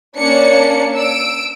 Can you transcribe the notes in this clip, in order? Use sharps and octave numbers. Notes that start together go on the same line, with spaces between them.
A#3 C#4 D4 D5 C#7
E6 D7